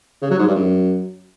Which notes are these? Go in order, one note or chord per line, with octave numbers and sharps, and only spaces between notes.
C#3
F#3
G#2
G2
F#2